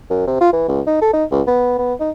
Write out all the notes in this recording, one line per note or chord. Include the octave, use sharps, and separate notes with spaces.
F#2
C3
F4
E3
C#2
D#4
A4
D#4
C#2
B3
B3
D#4